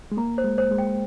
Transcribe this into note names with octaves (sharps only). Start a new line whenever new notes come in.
G#3
A#3 A#5
C5
G#3
C5
G#3
G5